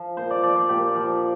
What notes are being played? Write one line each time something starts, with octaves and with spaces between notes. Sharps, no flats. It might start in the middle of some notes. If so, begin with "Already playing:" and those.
Already playing: F3
A#2 C5
D5
F3 D5
C5
A#2 G4
F3